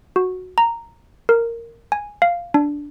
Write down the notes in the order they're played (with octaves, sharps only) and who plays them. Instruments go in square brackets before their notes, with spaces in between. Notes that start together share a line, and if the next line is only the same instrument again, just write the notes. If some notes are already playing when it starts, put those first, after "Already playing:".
[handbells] F#4
A#5
A#4
G#5
F5
D4